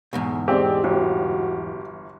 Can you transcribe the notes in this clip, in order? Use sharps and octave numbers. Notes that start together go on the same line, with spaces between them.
E2 G#2 B2
G#3 C4 G4 D5
G1 F#4